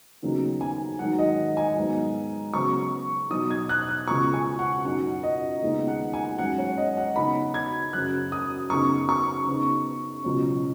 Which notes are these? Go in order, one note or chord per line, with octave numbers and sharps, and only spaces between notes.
D#2 C#3 F#3 B3 D#4
G#5
G#2 D#3 F#3 F#5
D#5
G#5
G#2 F#3 B3
C#3 F#3 B3 C#6
B2 F#3 D#4 D#6
G#6
F#6
F#6
C#2 C#3 B3 C#6
G#5
F#5
F#2 F#3 D#4 F#5
D#5
D#2 C#3 G#3 B3 D#4
F#5
G#5
G#2 F#3 C#4 F#5
C#5
D#5
F#5
C#3 B3 D#4 B5
G#6
F#2 C#3 F#3 F#6
D#6
F#2 C#3 B3 D#4 C#6
C#6
C#3 B3 D#4
C#2 B2 F#3 C#4